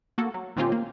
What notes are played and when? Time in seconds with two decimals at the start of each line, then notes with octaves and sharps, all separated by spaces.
0.18 A#3 F#4 A4
0.34 F#3
0.56 A#2 D#3 C4 C#4 F4 G4
0.72 A#3